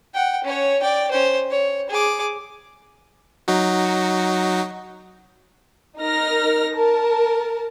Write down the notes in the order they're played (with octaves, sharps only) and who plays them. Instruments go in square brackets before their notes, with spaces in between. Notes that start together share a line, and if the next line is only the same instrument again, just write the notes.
[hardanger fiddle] F#5 G5
C#4 C#5
D5 G5
C#4 C5
C#5
G#4 D6
[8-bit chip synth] F#3 D#4 F#4
[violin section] D#4 A#4 F6 A#6
A#4 A5